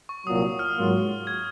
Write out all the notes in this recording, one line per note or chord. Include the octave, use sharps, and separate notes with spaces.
C#6
C2 A#2 F#3 D#6
D#6
F6
G#2 F#3 A#3 F4
G#6